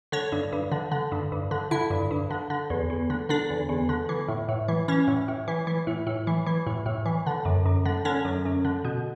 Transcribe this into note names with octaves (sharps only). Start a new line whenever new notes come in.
D3 C#5
G2
G2
D3
D3
G2
G2
D3
D3 E4
G2
G2
D3
D3
E2
E2
D3
D3 D4
E2
E2
D3
E3
A2
A2
E3
E3 C#4
A2
A2
E3
E3
A2
A2
E3
E3
A2
A2
E3
D3
F#2
F#2
D3
D3 C#4
F#2
F#2
D3
B2